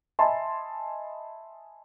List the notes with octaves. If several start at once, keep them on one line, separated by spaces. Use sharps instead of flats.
D#5 E5 G#5 A5 B5 C6